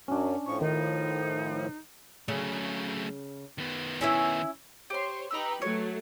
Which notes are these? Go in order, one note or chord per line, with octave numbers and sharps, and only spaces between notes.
F#2 F#3 C#4 D4
A2 F3 C#6
D#3 D#4
C#3 F#3 A3
D#3 B3
C#4 E4 E5
G4 C5 C#5 C6
D#4 G4 B4 A#5 E6
F#3 A3 C#5